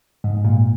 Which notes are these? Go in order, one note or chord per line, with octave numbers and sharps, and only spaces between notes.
G#2
A#2